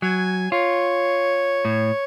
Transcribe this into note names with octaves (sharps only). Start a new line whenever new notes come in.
F#3 G#5
F4 C#5
A2